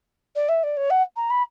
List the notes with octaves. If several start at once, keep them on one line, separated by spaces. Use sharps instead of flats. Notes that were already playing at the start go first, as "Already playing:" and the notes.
D5
E5
D5
C#5
F#5
A#5
B5